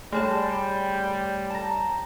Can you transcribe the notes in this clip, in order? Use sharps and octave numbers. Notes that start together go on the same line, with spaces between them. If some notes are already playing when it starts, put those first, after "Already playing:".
G3 A3 G#4 C#5 A5 E7
A5 A#5